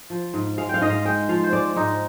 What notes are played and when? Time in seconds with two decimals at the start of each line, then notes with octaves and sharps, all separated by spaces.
0.10 F3
0.34 G#2
0.58 G#3 F5
0.69 F5 G5
0.81 G#2 D#5
0.90 F5
1.05 G#3 G5
1.29 F3 F5
1.44 C5
1.53 G#3 D5
1.76 G#2 D#4